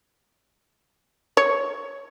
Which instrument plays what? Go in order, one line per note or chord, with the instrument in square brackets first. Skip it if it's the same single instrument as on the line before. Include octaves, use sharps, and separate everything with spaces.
[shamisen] C#5